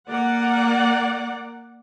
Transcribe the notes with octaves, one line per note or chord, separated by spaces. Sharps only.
A#3 D5 F#5